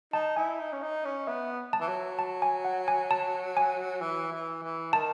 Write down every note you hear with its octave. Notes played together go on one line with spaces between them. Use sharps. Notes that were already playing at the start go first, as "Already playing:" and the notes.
D#4 A5
E4 G#5
D#4
C#4
D#4
C#4
B3 E5
A5
E3
F#3
A5
G#5
F#5
G#5
A5
G#5
E3
E3
E3
D#3 A5